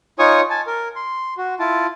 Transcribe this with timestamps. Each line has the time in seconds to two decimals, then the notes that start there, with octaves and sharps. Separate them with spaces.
0.19 D#4 F4 C#5 G#5 C#6 D#6
0.50 G#5 A5
0.67 A#4
0.96 C6
1.37 F#4
1.59 E4 F4 A5